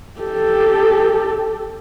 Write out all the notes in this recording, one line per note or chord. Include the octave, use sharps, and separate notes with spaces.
G4 A4